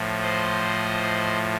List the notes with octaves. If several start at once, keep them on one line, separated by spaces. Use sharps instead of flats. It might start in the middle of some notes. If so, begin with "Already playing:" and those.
Already playing: A2 F3
C5 D#5